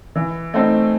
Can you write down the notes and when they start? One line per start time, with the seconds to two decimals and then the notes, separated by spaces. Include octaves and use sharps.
0.16 E3
0.54 A3 C4 D#4